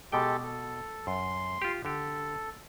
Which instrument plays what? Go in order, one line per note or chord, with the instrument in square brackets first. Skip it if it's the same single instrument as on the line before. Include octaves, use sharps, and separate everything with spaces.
[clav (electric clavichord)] B2 G5 [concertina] G#3 G4 A4
[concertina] A4
[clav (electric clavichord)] F#2 [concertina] C6
[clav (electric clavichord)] F4 G4
[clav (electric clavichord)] D3 G4 [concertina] A4